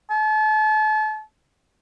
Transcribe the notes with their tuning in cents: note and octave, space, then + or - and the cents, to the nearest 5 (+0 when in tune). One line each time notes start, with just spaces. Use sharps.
A5 -35